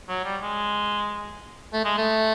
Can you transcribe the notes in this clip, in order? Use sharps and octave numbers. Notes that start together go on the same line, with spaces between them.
F#3
G3
G#3
A3
G#3
A3